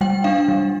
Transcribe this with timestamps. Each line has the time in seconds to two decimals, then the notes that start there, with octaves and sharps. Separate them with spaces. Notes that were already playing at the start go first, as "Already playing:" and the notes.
0.01 G3 G5
0.24 D4 F5
0.48 G3